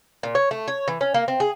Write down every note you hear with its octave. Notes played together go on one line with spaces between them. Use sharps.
A#2
C#5
A3
C#5
E3
C#4
A#3
C4
G#4